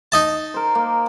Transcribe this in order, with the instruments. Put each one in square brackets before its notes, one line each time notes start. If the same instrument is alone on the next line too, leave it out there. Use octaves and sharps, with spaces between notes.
[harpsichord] D#4 D#5 A5
[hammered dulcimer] A#4 C5
A#3